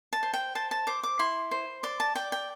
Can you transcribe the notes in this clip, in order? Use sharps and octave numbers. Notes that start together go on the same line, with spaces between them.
A5
C5
G5
C5 A5
A5
C5 D6
D6
E4 C6
C5
D5 C6
A5
D5 G5
G5